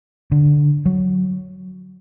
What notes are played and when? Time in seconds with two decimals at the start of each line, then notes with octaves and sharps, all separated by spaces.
0.32 D3
0.86 F#3